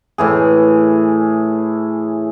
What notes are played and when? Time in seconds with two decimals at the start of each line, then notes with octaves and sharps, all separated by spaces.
0.18 A2 E3 G#4